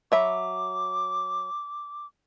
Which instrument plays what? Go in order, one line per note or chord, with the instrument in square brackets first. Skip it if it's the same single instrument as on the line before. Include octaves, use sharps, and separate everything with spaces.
[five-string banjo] F#3 E5 B5 [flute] D6